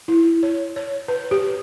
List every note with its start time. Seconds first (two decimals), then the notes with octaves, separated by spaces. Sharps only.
0.08 E4
0.43 C#5
0.76 C#5
1.08 B4
1.31 G4